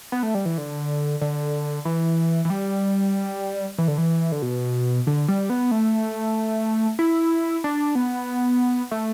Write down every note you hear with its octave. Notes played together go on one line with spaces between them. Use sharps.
B3
A3
G3
E3
D3
D3
E3
E3
G3
E3
D3
E3
D3
B2
D3
G3
B3
A3
E4
D4
B3
A3